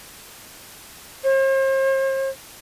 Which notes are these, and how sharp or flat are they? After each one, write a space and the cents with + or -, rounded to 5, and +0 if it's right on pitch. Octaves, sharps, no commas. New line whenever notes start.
C5 +45